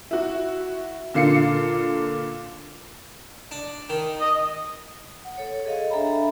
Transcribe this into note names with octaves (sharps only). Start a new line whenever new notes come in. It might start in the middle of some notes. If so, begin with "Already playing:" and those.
E4 F#4
A#2 D3 F5 C7 C#7
D4
D#3
D#5
F#5
A4 C#5
G#4 A4 D#5 F5
D4 A4 E5 G5 A#5 B5